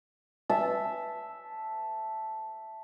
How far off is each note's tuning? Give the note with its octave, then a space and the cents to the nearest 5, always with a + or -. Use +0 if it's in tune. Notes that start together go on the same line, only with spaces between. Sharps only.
E5 +0 A5 -5